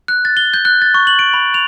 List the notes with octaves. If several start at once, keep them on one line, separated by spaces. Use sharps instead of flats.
F#6
A6
G7
G6
F#6
A6
C#6
F#7
D7
B5
F7